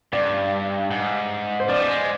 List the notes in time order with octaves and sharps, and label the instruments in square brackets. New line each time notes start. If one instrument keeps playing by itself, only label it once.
[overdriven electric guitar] G2 [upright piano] D5
[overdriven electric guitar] G#2
[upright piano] C5
[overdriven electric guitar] F3 [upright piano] D5
[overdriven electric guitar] G3
G#3